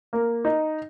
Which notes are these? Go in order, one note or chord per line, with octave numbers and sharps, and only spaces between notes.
A#3
D#4